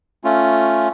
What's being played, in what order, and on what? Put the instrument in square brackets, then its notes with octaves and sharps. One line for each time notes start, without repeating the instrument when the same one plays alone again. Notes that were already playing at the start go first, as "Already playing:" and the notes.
[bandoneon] A3 C#4 F4